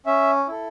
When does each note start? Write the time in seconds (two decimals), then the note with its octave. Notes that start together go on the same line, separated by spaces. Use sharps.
0.06 C#4 E5
0.48 E4 A4